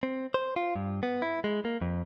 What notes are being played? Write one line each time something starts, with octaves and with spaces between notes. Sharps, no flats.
C4
C5
F4
G2
B3
E4
G#3
A#3
F2